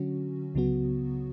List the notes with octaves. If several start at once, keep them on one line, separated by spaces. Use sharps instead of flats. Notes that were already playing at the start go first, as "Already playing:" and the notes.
Already playing: D3 F#3 C#4 F#4
C#2 C#3 F#3 B3 F#4